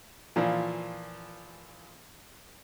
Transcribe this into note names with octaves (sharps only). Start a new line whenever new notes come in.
A#2 E3 F3